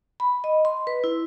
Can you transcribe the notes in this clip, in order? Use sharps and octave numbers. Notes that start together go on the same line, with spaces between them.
B5
D#5
C6
B4
E4